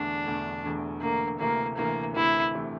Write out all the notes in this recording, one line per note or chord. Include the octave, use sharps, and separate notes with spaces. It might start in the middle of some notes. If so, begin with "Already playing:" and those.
Already playing: E1 E2 D3 A3 D4
E1 E2 D3 A3
E1 E2 D3 A3
E1 E2 D3 A3 A#3
D2 C3 E3 A3 A#3
D2 C3 E3 A3 A#3
D2 C3 E3 A3 E4
D2 C3 E3 A3